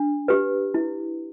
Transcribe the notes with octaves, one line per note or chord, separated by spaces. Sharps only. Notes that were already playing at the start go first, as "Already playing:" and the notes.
Already playing: D4
G4 B4
E4